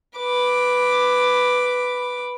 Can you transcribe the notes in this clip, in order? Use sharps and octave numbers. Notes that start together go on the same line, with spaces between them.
B4 D6